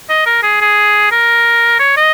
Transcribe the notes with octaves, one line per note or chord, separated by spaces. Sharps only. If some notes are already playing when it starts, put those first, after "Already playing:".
D#5
A#4
G#4
G#4
A#4
C#5
D#5